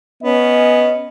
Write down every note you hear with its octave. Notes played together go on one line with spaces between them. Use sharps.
B3 C#4 D#5